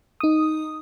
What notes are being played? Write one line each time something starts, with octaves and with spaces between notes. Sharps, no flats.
D#4 D#6